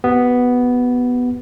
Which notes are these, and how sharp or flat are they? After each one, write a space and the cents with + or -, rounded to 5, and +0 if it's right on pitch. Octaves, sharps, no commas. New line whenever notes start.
B3 +0 G4 -45